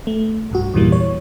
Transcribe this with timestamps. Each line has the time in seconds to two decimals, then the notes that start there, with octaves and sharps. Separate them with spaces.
0.07 A3
0.51 B1 G2 F#4
0.74 E2 G2 A#2 E3 G3 A#3
0.92 C#5